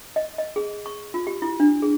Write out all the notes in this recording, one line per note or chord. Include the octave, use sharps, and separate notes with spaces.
D#5
D#5
G#4
C#6
F4
G4
E4
D4
G#4